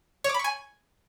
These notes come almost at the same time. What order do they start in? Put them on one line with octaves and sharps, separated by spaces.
C#5 D6 B5 C#6 G#5